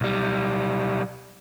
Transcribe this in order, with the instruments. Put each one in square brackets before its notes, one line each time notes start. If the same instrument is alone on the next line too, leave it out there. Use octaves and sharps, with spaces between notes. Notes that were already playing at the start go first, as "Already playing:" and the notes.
[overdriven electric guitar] B1 G3